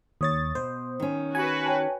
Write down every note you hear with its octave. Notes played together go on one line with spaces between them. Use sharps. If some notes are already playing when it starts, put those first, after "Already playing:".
D#2 C#5 D#6 A6
B2 C5
D#3 C#4
F#4 B4 G#5
C#5 G5 A5